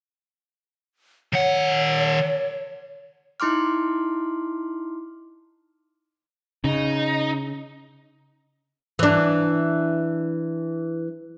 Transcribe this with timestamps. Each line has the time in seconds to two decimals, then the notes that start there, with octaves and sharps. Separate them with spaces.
1.33 D#3 C#5 F#5
3.40 D#4 E4 C6 D6 F6
6.64 C#3 D#4
8.99 E3 D4